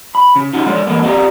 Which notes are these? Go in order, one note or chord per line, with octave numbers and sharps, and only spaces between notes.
B5
C#3
C#4 D#4 F4 F#4
D3 G#3 C#5 D5 C6
E3 G#3 A#3 B3
C4 G4 D5 F5 A5 A#5